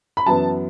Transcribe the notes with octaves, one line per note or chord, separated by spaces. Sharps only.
B5
F#2 E3 B3 A5